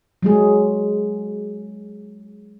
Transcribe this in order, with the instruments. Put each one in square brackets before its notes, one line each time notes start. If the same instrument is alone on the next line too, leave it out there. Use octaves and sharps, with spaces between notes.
[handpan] F#3 G#3 G#4